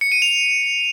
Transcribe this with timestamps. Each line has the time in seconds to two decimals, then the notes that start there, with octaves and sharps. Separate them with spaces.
0.01 C#7
0.12 D#7
0.22 F7